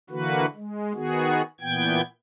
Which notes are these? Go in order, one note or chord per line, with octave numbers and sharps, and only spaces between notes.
D3 E3 A#3 F#4 B4
G#3
D#3 B3 F#4 G#4
A#2 E3 B3 G5 G#6